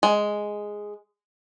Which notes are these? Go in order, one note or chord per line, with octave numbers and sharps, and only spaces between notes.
G#3